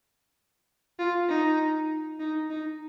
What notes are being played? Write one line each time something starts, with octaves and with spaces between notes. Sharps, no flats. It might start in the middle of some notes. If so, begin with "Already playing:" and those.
F4
D#4
D#4
D#4